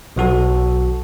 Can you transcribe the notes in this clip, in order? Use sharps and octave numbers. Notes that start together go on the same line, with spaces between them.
B1 F#3 F#4 A4